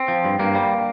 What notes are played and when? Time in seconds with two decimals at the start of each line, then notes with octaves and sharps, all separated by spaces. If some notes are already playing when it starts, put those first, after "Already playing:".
Already playing: C4
0.08 F3
0.24 G2
0.39 G2 A#3
0.55 G3